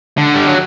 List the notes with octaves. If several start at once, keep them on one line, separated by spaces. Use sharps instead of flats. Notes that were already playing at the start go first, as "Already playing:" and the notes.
D3
G3
F#3